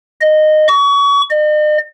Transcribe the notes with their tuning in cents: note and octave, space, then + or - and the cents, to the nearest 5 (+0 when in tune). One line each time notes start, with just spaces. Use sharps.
D#5 -15
C#6 +30
D#5 -45